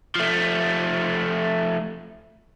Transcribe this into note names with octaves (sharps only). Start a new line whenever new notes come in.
F3 A3